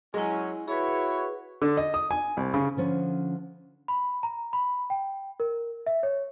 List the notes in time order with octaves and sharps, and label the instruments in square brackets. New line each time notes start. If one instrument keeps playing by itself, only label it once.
[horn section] F#3 C#4 [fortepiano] G#3 [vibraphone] E4 G#5
[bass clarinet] E4 [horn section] F#4 C#5 [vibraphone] G#4 B4
[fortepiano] D3
D#5
D#6
G#5
C2
C#3
[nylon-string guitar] D3 F3 C#4
[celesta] B5
A#5
B5
G5
A#4
E5
C#5